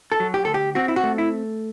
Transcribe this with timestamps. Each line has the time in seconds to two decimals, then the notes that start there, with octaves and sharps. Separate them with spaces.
0.12 A4
0.20 F#3
0.34 G4
0.45 D2 A4
0.54 G4
0.75 C4 F#4
0.88 E4
0.96 F#4
1.03 A3
1.18 E4